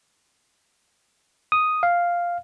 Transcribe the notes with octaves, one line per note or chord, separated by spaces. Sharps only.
D#6
F5